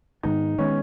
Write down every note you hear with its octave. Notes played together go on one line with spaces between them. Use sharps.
G#2 D#3 G#3 B3 D#4
D#3 G#3 B3 C#4